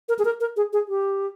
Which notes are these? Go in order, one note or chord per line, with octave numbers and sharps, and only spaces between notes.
A#4
G#4
A#4
A#4
G#4
G#4
G4